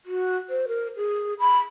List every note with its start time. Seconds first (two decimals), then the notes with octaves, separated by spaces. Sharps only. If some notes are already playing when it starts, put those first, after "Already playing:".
0.06 F#4
0.50 C5
0.68 A#4
0.96 G#4
1.39 B5